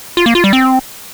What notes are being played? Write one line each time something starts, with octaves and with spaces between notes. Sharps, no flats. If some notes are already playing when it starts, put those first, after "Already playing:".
F4
A#3
F4
G3
C4